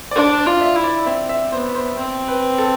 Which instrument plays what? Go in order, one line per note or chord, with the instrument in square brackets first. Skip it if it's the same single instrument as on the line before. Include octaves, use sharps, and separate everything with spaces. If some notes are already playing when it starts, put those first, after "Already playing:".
[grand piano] D5
[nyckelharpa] D4 [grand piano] C5
[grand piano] D5
[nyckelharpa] F4
[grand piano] E5
[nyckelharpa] E4
[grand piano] D5
[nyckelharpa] C4 [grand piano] E5
[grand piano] E5
[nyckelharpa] B3 [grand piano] C5
[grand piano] C5
[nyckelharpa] C4 [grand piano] C5
[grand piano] B4
A4